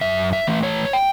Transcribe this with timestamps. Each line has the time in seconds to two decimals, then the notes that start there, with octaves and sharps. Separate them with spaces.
0.01 F#2 E5
0.33 E5
0.47 E3 A3
0.63 C#5
0.93 G5